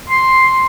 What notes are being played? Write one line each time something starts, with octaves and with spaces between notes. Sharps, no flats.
C6